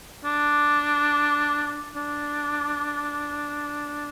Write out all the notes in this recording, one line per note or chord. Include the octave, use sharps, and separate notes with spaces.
D4
D4